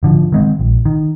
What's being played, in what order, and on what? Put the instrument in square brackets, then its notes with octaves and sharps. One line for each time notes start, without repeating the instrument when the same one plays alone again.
[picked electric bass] G#1 D3 F3
D#3 G#3 C4
A#1
D#3